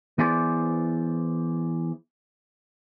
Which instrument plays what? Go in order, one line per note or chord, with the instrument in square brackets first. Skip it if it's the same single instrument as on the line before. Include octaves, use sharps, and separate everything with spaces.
[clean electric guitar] E3 B3 E4 G#4 C5 D5